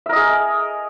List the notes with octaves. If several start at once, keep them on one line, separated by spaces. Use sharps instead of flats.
G#4 A#4 D#5 E5